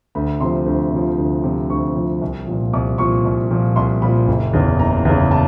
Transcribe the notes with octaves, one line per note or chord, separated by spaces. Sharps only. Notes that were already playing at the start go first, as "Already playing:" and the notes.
D2 B5
C3 F3 C6
D2
C3 F3
D2
C3 F3
D2 C#6
C3 F3
C2
A#2 F3
C2 D6
A#2 F3 C#6
C2
A#2 F3
C2 C6
A#2 F3 B5
F#1
E2 C#3
F#1 A#5
E2 C#3
A5